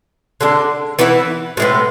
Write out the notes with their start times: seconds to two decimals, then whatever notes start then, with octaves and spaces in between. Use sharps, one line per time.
0.41 D3 G#3 D4
0.99 E3 B3 E4
1.57 A2 G#3 B3